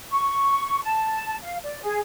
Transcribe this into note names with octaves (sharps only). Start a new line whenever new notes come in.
C#6
A5
F5
D5
G#4